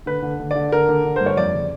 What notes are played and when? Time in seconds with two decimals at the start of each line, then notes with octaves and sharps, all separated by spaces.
0.06 D3 B4
0.22 D3
0.40 D3
0.51 D3 D5
0.72 D3 A#4
0.89 D3
1.05 D3
1.16 G2 C5
1.26 C#5
1.37 F2 D5
1.54 C#3